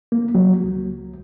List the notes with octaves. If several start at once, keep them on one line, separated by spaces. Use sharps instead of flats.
A#3
F#3
C#2